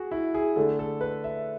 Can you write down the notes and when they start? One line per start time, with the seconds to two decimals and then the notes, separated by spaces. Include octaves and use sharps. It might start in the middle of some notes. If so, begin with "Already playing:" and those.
Already playing: F#4 G#4
0.11 E4
0.34 G#4
0.56 D3 A3 A4
0.79 A4
1.01 B4
1.24 E5